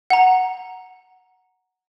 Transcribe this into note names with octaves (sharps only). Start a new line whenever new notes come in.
F#5 A#5